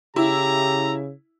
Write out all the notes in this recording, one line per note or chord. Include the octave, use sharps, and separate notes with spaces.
C#3 E4 G4 A#5